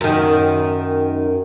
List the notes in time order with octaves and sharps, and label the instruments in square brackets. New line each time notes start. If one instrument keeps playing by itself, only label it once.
[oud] F#2 D#3